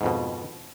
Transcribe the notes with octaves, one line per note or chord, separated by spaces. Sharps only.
F2 G#2 B2